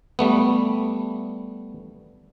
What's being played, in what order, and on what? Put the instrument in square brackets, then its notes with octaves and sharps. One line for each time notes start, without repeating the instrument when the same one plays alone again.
[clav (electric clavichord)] G3 A3 B3